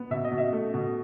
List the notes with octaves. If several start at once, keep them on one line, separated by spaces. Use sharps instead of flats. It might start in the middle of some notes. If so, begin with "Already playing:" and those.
Already playing: B3
B2 E5
D#5
B2
E5
A3
B2